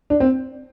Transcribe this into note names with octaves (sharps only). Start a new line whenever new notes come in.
D4
C4